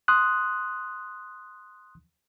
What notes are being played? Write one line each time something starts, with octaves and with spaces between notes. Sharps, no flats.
C6 D#6 F#6